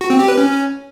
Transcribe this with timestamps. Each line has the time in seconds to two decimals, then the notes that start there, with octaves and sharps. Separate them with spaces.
0.01 F#4
0.10 C4
0.19 G4
0.28 B4
0.37 C#4